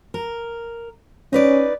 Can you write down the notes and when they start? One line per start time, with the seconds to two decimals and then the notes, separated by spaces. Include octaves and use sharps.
0.14 A#4
1.33 C#4 D#4 B4 D5